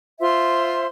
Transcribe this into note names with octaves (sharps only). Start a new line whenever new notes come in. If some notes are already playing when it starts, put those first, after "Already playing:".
F4 C5 E5 C6